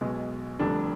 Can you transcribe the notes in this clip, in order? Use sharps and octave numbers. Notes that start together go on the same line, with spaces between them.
B1 B2 G#3
F1 F2 D3 G3 D4